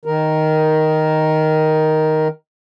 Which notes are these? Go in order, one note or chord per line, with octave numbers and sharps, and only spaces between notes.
D#3 A#4